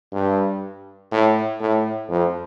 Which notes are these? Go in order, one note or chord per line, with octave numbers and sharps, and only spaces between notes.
G2
A2
A2
F2